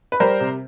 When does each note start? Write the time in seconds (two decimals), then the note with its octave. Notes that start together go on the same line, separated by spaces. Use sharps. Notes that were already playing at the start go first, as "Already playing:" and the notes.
0.12 B4
0.20 G3 A#4 C5
0.40 C3